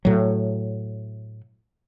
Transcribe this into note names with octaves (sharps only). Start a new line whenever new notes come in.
A2 F#3